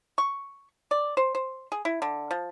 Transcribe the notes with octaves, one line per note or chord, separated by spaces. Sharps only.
C#6
D5
C5
C5
G#4
E4
D3
F3